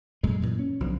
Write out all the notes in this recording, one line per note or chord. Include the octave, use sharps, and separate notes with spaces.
F#2 A#2 G#3
F#2 A#2 E3
C#4
B1 B2 D3 F3